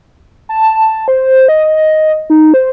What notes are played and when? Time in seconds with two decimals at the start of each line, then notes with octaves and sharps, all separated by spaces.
0.49 A5
1.08 C5
1.48 D#5
2.30 D#4
2.54 C5